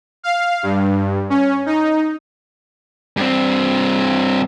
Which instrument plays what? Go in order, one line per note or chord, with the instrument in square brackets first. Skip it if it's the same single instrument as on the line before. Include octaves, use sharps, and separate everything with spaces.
[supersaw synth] F5
G2
C#4
D#4
[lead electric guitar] G2 C4